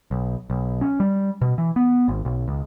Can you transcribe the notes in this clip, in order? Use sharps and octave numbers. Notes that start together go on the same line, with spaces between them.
B1
B1
C#4
G3
B2
E3
B3
G#1
B1
C#2